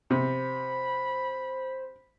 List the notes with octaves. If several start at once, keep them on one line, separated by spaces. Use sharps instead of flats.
C3 C5 B5